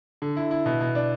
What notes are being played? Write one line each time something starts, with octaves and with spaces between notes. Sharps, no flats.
D3
E4
E4
B2
B2
D4